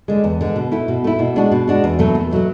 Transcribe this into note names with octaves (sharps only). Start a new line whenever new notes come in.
D3 G#3
E2
D3 G#3
B2
A3 E4
B2
A3 E4
B2
G#3 D4 F#4
B2
G#3 D4 F#4
E2
B2 F#3 A3
E2
B2 F#3 A3